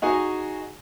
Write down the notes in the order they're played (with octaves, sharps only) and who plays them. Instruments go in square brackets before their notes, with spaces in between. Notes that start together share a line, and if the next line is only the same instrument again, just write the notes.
[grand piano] D#4 F#4 G#4 G#5 A#5